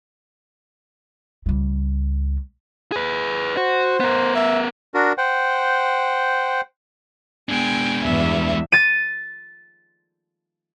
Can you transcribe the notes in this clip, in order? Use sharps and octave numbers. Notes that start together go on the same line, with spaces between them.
C#2 G3
G#4 B4
F#4 C5
B3 A#4
E5
D4 F#4 A#4
C5 F#5 G5
G#3 B3 D4 G5 G#5
E2 G2 E5
A6 D#7